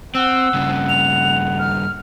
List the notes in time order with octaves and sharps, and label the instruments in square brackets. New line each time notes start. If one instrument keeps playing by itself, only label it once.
[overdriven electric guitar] C4 [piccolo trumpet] F#5 [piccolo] E6
[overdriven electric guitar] G2 C#3
[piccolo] F7
F6